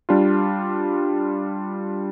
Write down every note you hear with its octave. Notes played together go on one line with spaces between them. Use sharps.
G3 D4 F4